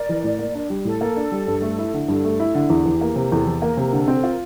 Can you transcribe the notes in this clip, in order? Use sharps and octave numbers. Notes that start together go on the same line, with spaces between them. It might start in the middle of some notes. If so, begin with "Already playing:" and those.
Already playing: A#4 D5
E3
A2
A#3
D4
G3
A2 A4
A#3
D4
G3
G2
A3
E4
D3
G2 A4
A3
E4
D3
E2 G4
E3
A#3
C3
E2 A4
E3
A#3 A#4
C3
D3 A4
C4
A4
F4
A#4